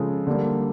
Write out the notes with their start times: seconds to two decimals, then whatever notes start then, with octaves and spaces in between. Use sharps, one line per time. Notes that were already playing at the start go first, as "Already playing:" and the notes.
Already playing: C#3 F3 G#3 A4
0.27 D3 G3 A#3